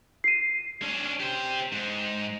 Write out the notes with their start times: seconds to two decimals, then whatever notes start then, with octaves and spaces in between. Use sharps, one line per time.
0.24 C7 D#7
0.82 C#4 D4
1.20 G4 C5
1.72 G#2